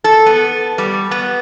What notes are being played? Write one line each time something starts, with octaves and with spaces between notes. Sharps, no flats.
A4
B3
G3
B3